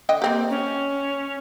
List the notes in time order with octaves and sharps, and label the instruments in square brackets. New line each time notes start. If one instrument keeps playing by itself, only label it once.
[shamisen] D3 D#5 G5
A#3 C4 G4
[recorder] C#4